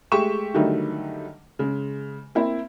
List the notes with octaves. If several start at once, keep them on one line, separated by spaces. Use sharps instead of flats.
G#3 A3 G4 C#6 E7
D3 D#3 F#3 G3 A3 D#4
C#3 G#3
A#3 C4 E4